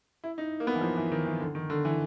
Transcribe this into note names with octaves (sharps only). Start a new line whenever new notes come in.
E4
D#4
A#3
B3
E3
F3
E3
D#3
E3
D3
D#3
D3
E3